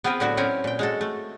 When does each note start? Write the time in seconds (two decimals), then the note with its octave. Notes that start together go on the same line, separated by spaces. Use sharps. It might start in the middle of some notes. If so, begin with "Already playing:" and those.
0.04 B3 C4 F4 A#4 B4
0.20 A2 D3 F#3 B3 E4 F#4
0.37 F#3 C4 C#4 E4 A#4 C#5
0.64 A#2 G5
0.79 G#3 F#4 A4
1.01 A3